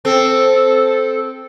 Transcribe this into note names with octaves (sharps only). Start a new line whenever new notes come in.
C4 A4